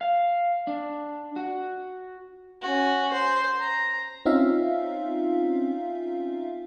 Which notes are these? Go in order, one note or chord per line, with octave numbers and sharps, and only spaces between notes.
F5
D4
F#4
C#4 F#4
C5
A#5
C4 C#4 D#4 F4 E5 F5